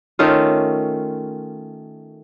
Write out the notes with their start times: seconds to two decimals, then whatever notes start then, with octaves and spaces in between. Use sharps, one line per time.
0.19 D#3 A3 C#4 F4